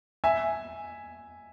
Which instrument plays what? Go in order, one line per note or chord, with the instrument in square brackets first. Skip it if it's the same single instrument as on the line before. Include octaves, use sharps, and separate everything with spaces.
[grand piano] E5 G#5